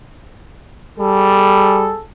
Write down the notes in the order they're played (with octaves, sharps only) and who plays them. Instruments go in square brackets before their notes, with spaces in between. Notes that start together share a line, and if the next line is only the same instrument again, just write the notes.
[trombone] G3 [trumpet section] G#4 A4